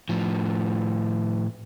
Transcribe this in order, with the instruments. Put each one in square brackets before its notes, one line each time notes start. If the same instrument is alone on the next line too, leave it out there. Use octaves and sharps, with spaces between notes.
[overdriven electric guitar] A2 F3